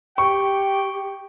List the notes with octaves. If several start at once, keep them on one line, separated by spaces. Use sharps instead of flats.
G4 G5 C#6